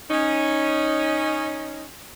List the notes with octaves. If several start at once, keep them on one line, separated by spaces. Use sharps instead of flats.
C#4 D#4